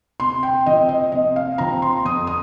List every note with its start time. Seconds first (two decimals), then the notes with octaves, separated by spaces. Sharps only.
0.20 C3 C6
0.43 G5
0.66 F3 C4 D#5
0.89 D#5
1.12 C3 D#5
1.36 F5
1.58 F3 C4 A#5
1.82 C6
2.05 F2 D#6
2.27 D#6